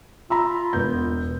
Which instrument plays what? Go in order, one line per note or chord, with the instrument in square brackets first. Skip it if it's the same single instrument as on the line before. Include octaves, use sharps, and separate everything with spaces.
[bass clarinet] F4 [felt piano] A#5 B5 E6
[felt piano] E1 B3 G6